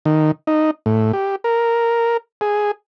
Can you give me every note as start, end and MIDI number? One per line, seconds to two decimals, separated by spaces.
0.05 0.31 51
0.47 0.71 63
0.86 1.12 45
1.13 1.36 67
1.44 2.17 70
2.41 2.71 68